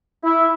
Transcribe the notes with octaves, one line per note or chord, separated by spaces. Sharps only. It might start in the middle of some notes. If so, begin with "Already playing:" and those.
E4